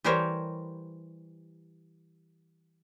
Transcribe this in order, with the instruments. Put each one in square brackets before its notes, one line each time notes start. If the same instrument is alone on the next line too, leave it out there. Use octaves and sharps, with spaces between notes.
[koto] E3 G3 G4 A#4 C5 C#5